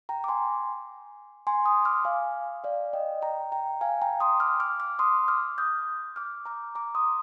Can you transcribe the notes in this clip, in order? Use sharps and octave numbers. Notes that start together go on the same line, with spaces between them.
G5 A#5
D6
G#5 C6
G#5 C6
C6 D#6
D6 F6
F5 G#5
D5 F5
D#5 G5
G5 A#5
G5 A#5
F5 G#5
G5 A#5
C6 D#6
D6 F6
D6 F6
D6 F6
C6 D#6
D6 F6
D#6 G6
D6 F6
A#5 D6
A#5 D6
C6 D#6